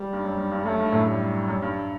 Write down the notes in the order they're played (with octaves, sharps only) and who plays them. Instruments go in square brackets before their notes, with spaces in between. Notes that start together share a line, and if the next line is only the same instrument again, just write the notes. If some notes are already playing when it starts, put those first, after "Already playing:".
Already playing: [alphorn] G3
[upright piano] G2
F#2
G2
G2
[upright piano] F#2 [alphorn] A3
[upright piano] G2
F#2 A2
[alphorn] G3
[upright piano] F#2
G2